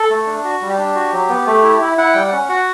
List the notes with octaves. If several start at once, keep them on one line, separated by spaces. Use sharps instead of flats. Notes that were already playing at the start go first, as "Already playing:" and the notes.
Already playing: A4
A3
D4
F#4
G3
G4
D4
F#4
F#3
B3
A3
E4
E4
E4 F#5
G3 G5
F#5
C#4
F#4 F#5